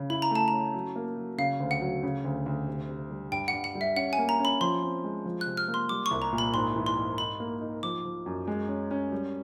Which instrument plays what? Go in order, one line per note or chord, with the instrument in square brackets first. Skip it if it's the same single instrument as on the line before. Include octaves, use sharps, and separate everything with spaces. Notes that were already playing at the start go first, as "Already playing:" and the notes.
Already playing: [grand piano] C#3
[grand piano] E4 [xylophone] B5
[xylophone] A#5
[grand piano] A3 [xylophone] A5
[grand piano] C#4 [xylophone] A#5
[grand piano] F#3
A#3
F#3
[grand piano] C#3 [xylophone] F5
[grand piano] D2
[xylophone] F#5
[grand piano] F#3
C#3
D2
D2
C3
C3
G3
[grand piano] G2 [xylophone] G5
[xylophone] F#5
[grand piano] G2
[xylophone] F#5
[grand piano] G3
[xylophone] E5
[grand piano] C#4 [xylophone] F#5
[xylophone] G#5
[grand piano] A#3
[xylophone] A#5
[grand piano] C#4
[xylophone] B5
[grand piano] F3 [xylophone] C6
[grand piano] C4
G#3
F3
[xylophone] F#6
[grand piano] C3
[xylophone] F6
[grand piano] A#3
[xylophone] C6
[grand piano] G3 [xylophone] D6
[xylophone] C#6
[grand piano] C2
[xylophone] A#5
[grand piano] A#2
[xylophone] B5
[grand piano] G#2 [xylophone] C6
[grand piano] E3
[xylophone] C6
[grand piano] G#2
[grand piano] D#4 [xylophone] B5
[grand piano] A#3
D#4
[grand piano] F3 [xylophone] D6
[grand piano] F3
F#2
G#3
C#4
C#4
G3